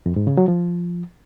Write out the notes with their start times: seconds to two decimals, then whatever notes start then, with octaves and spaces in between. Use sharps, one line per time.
0.06 F2
0.16 G#2
0.27 C#3
0.37 F#3
0.48 F3